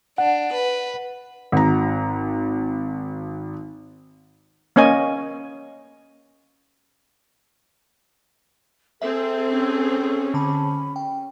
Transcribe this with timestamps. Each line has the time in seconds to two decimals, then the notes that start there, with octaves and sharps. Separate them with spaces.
0.18 D4 F#5
0.53 B4
1.52 G#1 A#5
4.76 A#3 C#4 C#5 D#5 G#5
9.02 C4 G#4 A4 E5
9.50 C#4
10.34 D3 A5 B5
10.96 G5